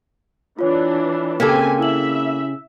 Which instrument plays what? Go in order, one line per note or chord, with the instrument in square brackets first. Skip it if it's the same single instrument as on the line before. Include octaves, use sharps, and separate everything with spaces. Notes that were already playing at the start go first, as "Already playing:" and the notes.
[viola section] E3 D4 [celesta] F4 C#5
[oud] C#3 G4 [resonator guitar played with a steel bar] A#3 A4 [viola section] C4 G#5 [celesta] B6
[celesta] E4 F#7 [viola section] E5